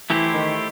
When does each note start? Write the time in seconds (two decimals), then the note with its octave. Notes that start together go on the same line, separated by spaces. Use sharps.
0.10 E3 A3 E4 G4 C5
0.34 D#3